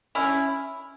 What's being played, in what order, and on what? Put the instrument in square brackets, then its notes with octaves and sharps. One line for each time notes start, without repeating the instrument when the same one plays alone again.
[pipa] C#4 E4